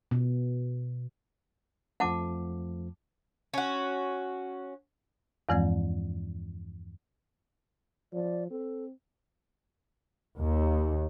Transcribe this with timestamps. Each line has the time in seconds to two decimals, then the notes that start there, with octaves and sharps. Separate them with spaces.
0.11 B2
2.00 F2 F3 A3 F#5 A5 D6
3.54 C#4 F#4
5.49 E2 G2 E3 F3 G#3 C4
8.13 F3 D5
8.51 C4 A4
10.38 D#2